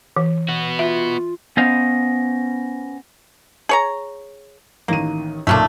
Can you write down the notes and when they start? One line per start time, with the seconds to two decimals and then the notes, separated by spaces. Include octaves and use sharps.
0.17 E3
0.49 B3 F#4
0.79 F4 E5
1.57 B3 C#4 C5 D#5 F5
3.69 G#4 C#5 A#5
4.88 A1 D#3 A#3 D#7
5.47 B1 A#2 D3 A3 C#4 D4